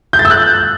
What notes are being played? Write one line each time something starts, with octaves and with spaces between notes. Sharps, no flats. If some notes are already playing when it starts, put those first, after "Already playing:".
G6
A6
E6
F#6